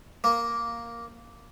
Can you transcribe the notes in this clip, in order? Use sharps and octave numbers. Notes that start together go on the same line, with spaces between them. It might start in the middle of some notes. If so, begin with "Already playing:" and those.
A#3